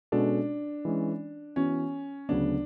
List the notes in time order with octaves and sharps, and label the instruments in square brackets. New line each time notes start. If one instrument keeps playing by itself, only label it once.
[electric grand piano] B2 G#3 C#4 F#4 A4 [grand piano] D4
[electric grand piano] E3 G#3 C#4
[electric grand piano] E3 B3 F#4 [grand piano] C#4
[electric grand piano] D2 C#3 F#3 B3 [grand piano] D4